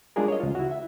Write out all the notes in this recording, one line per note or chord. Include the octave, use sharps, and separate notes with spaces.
G3 G#3 D4 F4 G#4 A#4
C#5 D#5
C#2 F4
E4 F#4
E5